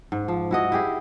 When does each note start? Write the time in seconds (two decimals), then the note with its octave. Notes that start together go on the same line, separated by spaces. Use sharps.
0.12 G#2
0.28 F3
0.51 E4 F#4 D#5
0.72 E4 G4 G#4